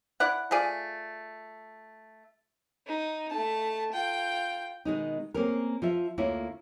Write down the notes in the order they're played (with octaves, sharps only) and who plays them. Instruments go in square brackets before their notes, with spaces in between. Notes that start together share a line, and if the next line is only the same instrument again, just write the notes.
[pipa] E4 D5 F#5
A3 F4 G#4 D5
[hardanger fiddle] D#4
A3 A5
F4 G5
[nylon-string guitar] B2 D#3 G#3 D#4
A#3 C4 C#4 G#4 A#4
F3 F4 E5
D2 A#3 E4 F4 C#5 E5